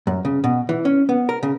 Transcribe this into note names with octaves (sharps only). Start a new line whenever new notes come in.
F#2
C#3
B2
E3
C#4
B3
A#4
C#3